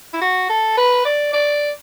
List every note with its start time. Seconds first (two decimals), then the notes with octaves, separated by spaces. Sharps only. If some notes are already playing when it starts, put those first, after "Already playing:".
0.13 E4
0.21 F#4
0.49 A4
0.77 B4
1.05 D5
1.33 D5